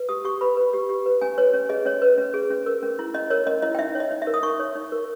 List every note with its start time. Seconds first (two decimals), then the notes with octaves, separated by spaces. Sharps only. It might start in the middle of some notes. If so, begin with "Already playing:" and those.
Already playing: B4
0.09 G4 D#6
0.24 G4 C#6
0.41 B4 B5
0.57 B4
0.73 G4
0.89 G4
1.06 B4
1.21 C#4 G#5
1.38 B4 C#5
1.54 C#4
1.69 G#4 D#5
1.85 C#4 C#5
2.02 B4
2.18 C#4
2.34 G#4
2.50 C#4
2.66 A#4
2.82 C#4
2.99 E4
3.14 C#4 D#5
3.30 A#4 C#5
3.47 C#4 D#5
3.62 E4 D#5
3.75 G5
3.79 D#4 E5
3.95 C#5
4.00 D#5
4.11 D#4
4.22 E5
4.27 A#4
4.34 D#6
4.43 D#4 C#6
4.60 C#5
4.76 D#4
4.92 A#4